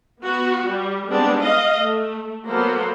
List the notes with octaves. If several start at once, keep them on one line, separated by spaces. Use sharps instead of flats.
B3 F#4
G3
G3 G#3 B3 C4 D4
D#5 F5
A3
F#3 A#3 B3 A4 C5